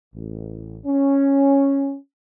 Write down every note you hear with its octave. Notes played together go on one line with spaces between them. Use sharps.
A1
C#4